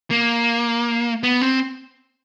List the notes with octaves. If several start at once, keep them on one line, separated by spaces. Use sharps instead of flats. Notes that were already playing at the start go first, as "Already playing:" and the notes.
A#3
B3
C4